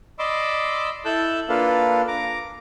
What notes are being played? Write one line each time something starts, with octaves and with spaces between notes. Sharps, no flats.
D5 D#5 B5 C6 D6 E6
E4 A4 A5 E6 F#6 G6
A#3 D4 F4 A4 B4 F5
A#5 D6